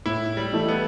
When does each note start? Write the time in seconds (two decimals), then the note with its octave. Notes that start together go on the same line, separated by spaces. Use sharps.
0.06 A2 E4
0.37 G3
0.53 E3 A3 E4 A4
0.68 B3